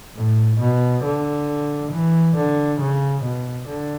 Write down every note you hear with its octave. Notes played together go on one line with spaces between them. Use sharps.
A2
B2
D3
E3
D3
C#3
B2
D3